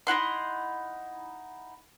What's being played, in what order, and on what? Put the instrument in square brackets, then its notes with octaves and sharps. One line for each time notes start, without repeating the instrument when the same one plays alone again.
[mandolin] D#4 E4 F#5 C6